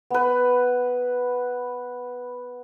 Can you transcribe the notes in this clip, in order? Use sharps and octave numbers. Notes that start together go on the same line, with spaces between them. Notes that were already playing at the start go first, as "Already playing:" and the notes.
B3 B4